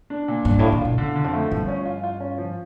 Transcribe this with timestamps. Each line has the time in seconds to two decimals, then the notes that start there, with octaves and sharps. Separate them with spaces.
0.10 D4
0.28 A#2
0.45 G2 D4
0.59 A2 F4
0.72 D3
0.81 A#2 F4
0.98 E2 D3
1.15 D3
1.24 F2
1.33 A3
1.51 G2 F3
1.68 C#4
1.86 F4
2.04 F4
2.20 C#4
2.38 F3